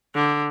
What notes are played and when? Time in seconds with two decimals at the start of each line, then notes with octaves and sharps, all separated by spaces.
0.15 D3